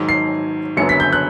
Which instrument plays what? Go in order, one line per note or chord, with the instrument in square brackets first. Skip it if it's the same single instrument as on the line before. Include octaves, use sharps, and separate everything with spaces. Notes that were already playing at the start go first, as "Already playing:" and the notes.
Already playing: [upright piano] G#2 D#3 F#3
C7
F#1 F#2 D3 F#3 B3 C#7
B6
G6
F#6